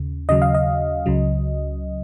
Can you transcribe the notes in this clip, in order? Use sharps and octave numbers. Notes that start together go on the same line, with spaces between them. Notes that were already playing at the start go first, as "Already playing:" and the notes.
Already playing: D#2 C#3
D#2 C#3 F#3 D#5
F5
D#5
C#2 C#3 F#3